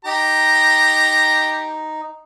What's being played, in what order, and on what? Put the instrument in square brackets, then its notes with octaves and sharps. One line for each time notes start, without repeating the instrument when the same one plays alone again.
[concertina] D#4 [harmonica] G4 A#5